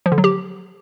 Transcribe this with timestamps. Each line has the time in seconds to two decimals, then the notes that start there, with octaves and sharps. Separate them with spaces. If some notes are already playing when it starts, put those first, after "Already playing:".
0.06 F3
0.12 D3
0.18 F#3
0.24 G4